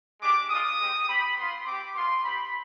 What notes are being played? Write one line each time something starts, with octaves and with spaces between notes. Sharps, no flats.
G#3 D4 G4 D6
G#3 D4 F4 D#6
G#3 C4 G4
C4 G4 B5
B3 F4 C6
C4 G4 D6
B3 F4 C6
C4 G4 B5